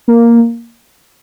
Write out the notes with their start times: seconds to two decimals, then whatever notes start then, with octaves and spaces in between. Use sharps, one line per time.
0.08 A#3